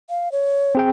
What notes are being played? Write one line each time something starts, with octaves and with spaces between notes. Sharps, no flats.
F5
C#5
C4 G#4 G5